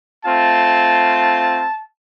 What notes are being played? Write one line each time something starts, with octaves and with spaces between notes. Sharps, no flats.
A3 C4 F4 A5